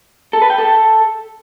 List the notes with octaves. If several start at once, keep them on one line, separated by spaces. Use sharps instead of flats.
A4
B4
G5
A4